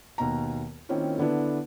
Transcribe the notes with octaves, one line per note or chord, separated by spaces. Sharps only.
D#2 B2 A#5
D#3 A#3 C4 C#4 E4 F4
D3 B3 D4 E4